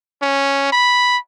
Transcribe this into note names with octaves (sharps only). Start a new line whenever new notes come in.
C#4
B5